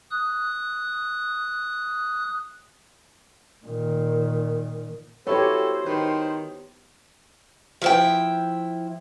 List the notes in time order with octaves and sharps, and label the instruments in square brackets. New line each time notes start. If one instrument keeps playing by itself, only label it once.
[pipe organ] D#6 F#6
[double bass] A#2 D#3
[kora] B3 E4 F#4 [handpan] G4 C#5 [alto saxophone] A4 [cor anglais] C5
[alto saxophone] D#3 [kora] B4
[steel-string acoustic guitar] F3 E4 G5